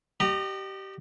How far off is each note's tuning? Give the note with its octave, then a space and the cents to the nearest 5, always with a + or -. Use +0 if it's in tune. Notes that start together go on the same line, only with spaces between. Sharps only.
G4 -20 D#5 -40 A#5 -15